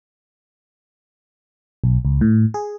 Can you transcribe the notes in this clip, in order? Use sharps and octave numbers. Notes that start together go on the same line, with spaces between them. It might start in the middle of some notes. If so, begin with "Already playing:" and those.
B1
C#2
A2
G#4